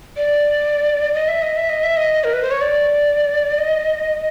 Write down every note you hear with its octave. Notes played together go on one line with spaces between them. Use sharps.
D5
D#5
E5
D#5
E5
D#5
E5
D#5
A#4
B4
C5
C#5
D5
D#5